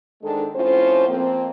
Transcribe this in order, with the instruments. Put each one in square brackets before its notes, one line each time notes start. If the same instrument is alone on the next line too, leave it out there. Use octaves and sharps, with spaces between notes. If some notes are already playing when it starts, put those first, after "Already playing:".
[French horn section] G#2 D#3 G#3 D4 A4
F2 A2 C#4 F4 C5
F2 A#3 C4